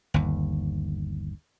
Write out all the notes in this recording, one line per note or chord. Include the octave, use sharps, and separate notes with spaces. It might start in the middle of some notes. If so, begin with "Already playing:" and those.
G1 D#2